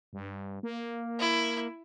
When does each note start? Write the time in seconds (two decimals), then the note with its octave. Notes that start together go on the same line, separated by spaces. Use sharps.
0.13 G2
0.63 A#3
1.19 E4